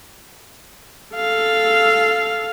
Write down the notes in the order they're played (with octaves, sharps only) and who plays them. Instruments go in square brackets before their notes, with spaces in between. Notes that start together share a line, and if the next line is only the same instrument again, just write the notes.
[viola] A4 F5